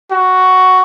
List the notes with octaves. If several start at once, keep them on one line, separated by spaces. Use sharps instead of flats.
F#4